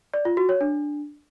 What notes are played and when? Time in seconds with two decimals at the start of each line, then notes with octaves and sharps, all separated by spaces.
0.14 D5
0.25 F4
0.37 F#4
0.49 C#5
0.61 D4